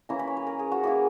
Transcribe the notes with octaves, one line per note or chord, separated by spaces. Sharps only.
E3 A#3 C#4 E4 A#5
B5
C#5
B4
A#4
G#4
F#4
E3 A#3 E4 G#4